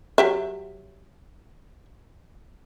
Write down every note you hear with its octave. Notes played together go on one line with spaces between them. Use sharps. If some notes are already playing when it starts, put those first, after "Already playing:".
F#3 G4 E5